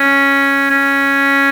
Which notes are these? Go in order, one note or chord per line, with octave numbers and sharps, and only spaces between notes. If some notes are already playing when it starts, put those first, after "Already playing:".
Already playing: C#4
C#4